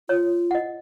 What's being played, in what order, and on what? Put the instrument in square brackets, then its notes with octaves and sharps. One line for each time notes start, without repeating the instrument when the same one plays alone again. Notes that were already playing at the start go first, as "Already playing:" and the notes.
[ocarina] F4 [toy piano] C#5
[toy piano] D#5 F#5